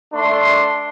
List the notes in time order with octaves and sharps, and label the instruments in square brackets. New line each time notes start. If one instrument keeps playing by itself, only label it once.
[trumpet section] A3 D4 C6